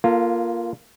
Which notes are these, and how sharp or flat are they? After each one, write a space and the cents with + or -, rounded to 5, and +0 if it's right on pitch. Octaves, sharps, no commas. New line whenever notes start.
A#3 +15 F4 -10 A4 +35